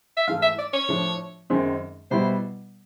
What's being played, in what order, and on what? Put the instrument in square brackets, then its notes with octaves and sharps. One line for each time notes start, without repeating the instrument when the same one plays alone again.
[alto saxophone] E5
[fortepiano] G#2 E3 A3 [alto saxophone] F5
[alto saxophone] E5
D5
C#5
[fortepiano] A2 F3 A3 D4
F#2 D#3 G#3 C4
[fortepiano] B2 G3 B3 E4 [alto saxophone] C5